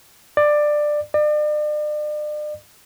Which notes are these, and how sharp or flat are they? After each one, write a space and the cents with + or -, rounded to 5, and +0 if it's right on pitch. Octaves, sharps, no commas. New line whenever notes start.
D5 +15
D5 +40